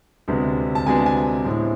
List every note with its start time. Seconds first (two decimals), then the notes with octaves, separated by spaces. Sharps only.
0.28 D2 C3 G#3 B3 D4
0.75 A5
0.86 D2 C3 G#3 B3 D4 G#5
1.06 G#5
1.45 A2 G#3 C4 E4